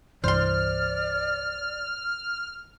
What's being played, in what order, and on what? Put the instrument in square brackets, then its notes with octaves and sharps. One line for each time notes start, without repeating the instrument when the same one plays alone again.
[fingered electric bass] C2 G2 E3 [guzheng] C5 C6 [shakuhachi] D5 [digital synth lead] F6